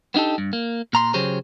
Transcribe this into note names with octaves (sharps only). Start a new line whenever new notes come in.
B3 D4 D#4 G4 A4
G2
A#3
A#2 A#5 C6
C#3 F#3 G4 G#4 C5 C#5